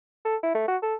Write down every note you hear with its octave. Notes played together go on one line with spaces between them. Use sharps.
A4
E4
A3
F#4
A4